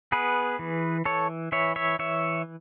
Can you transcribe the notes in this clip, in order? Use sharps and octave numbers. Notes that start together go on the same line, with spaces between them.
B3 G#4 B4
E3
E3 A4 C#5
E3 C#5 E5
C#5 E5
E3 C#5 E5